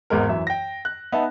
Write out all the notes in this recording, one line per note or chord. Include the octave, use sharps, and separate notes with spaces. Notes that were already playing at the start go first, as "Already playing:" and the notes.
G#1 E2 G#3 A#4
F#2 E3 E5
G5 A#6
F#6
B3 D#4 E5 A5